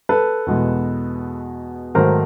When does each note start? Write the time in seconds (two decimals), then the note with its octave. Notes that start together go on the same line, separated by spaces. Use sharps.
0.09 A4 B4
0.47 E2 B2 G#3
1.95 G#2 D#3 F#3 A3 A#4 C5